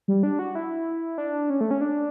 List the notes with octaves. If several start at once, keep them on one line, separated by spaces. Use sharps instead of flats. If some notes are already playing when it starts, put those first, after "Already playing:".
G3
D4
F#4
E4
D4
C#4
A3
C#4
D4